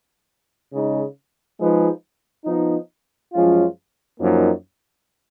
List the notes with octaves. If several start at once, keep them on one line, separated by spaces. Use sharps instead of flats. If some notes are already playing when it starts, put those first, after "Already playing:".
C#3 G#3 D#4
F3 G#3 D#4 G#4 B4
F3 B3 D#4
F#2 F3 G#3 C#4 F4
F#2 F3 A#3 D#4